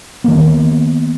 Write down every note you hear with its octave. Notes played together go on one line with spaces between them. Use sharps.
D#3 A#3 B3